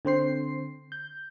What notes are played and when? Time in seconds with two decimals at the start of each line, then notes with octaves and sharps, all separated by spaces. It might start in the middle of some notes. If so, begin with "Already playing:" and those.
0.05 D3 C4 C5 C7
0.92 G6